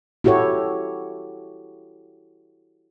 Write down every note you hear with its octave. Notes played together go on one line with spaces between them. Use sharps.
E4 F#4 G4 A4 C#5